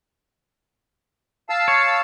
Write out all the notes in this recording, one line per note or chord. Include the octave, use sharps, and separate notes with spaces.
F5 A5 E6
C#5